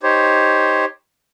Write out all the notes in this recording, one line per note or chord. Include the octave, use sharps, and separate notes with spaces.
D#4 G4 C5 C#5